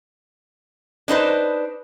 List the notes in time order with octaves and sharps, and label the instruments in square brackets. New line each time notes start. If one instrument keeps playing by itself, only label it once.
[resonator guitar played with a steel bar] D4 D#4 B4 C5